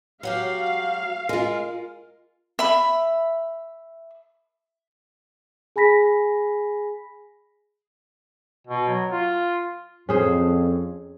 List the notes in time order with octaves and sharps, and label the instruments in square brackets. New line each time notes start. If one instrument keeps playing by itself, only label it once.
[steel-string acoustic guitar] F#3 F#4 G4 [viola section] F5
[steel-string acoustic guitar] G#3 [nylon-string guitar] F4 A#4
[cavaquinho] E5 B5
[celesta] G#4 G#5 B5 A#6 B6
[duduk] B2
F#3
F4
[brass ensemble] F2 [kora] C#4 G#4 C5